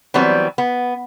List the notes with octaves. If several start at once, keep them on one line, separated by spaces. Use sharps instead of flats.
E3 F#3 G3 B3 C4
B3